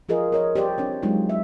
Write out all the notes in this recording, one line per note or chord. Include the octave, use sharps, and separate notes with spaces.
F3 F4 G#4 A#4 D#5
A#4 C#5 D#5
G4 C5 D5
C4 D4 C#5
F#3 G#3 A#3 D#4 F4
E5